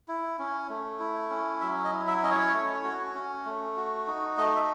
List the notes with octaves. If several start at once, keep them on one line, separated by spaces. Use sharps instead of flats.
E4
C#4
A3
E4
C#4
F#3 E5
D#5
E4
E5
C#4 D#5
C#5
A3
F#4
C#4
A3
F#4
D#4
A3 D#5
E5